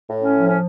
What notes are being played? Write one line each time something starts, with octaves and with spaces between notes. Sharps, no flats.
A2
C#4
F3
C#4